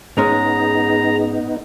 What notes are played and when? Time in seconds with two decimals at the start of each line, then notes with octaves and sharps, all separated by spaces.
0.17 G#2 G#3 B3 C#4 D#4 G#4 A#5